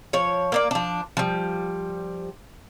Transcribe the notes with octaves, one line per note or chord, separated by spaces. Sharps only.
F3 C#5
A#3 D4 D5
F3 D4
F3 G3